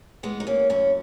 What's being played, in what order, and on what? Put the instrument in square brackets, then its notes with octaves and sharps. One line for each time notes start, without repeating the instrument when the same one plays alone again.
[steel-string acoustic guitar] E3 G#3 B3
D#4
A#3 C#4
F#2 C#4 E4